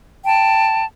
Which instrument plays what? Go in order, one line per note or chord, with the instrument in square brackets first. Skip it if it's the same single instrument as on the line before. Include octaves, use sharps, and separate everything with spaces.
[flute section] G5 A5